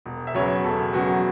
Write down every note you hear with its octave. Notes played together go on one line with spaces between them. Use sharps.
E1
E5
E2 C#3 F#3 C#5
E1 A4
E2 C#3 F#3 F#4